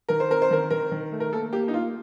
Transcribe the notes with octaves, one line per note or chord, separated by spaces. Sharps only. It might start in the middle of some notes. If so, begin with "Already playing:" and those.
D#3 A#4
C5
C4 A#4
C5
D#3 A#4
D#3 A#4
D#3
A3
A#4
A#3 A4
A#3 G4
D#4
A#3 F4